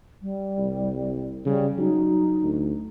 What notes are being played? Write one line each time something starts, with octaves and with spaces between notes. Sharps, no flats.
G3
C2
C#3 G3
F#3 D#4
D2